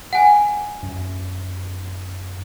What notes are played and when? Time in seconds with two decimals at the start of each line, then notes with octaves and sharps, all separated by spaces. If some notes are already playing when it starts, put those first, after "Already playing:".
0.13 F#5 G#5
0.83 F#2